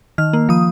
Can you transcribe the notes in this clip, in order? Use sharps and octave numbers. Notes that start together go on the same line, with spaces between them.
D#3 F6
A#3
F3 D#6